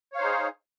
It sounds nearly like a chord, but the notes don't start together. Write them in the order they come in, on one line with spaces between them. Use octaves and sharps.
C#5 F5 C5 D#4 G#4